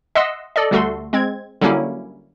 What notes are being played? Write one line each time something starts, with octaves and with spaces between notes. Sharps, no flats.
D#5 E5 F#5 C6 E6
A4 D5 D#5
D2 G3 A3 F#4 A4 C6
G#3 C4 G#6
D3 F#3 G3 A#3 C#4 E4